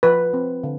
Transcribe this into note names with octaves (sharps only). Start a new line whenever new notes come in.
F3 B4
C4
D3